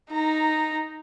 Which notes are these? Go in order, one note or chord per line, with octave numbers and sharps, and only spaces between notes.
D#4 A#5